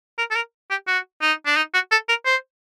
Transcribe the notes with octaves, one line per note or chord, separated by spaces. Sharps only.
A#4
A4
A#4
G4
F#4
D#4
D4
D#4
F#4
A4
A#4
C5